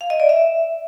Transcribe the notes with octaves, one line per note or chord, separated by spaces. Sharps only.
F5
D#5
D5
E5